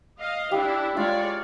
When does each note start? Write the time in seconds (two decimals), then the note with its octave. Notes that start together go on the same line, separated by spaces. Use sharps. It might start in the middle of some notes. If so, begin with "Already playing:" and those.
0.19 D#5 F5
0.51 D4 E4 G4
0.97 G#3 F4 C#5 D5 A#5